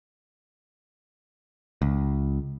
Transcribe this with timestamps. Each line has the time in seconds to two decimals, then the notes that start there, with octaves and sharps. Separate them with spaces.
1.82 C#2